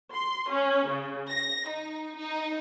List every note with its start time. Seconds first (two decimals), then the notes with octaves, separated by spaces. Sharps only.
0.14 C6
0.51 C#4
0.89 C#3
1.30 A#6
1.70 D#4
2.19 D#4